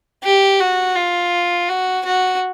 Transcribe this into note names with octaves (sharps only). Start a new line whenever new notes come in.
G4
F#4
F4
F#4
F#4